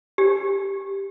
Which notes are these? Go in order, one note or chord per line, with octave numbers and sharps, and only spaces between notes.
G4